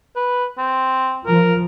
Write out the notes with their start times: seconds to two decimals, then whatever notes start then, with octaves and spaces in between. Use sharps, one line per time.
0.16 B4
0.58 C4
1.26 F3 A#4